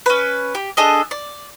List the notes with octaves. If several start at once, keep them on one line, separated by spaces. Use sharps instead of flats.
C#4 B4
G4
D4 G#4 A4 D#5
D5